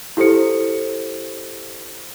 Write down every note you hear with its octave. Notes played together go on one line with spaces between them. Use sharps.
E4 G4 A4 C5 C#7